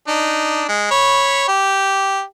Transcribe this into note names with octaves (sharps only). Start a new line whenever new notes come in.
D4 D#4
G#3
C#5 B5
G4